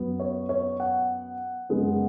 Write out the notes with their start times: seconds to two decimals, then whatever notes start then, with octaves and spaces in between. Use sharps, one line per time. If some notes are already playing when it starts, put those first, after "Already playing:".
Already playing: F#2 F#3 B3
0.20 C#5
0.49 C#5
0.80 F#5
1.69 F#2 C#3 G#3 B3